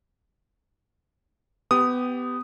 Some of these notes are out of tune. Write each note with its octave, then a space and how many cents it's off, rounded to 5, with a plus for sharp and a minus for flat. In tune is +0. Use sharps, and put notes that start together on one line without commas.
B3 +20 G4 +0 D#6 -5